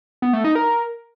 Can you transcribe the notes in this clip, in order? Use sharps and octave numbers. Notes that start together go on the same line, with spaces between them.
B3
A3
D#4
A#4